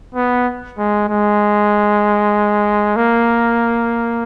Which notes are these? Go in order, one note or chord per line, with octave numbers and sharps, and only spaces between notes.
B3
G#3
G#3
A#3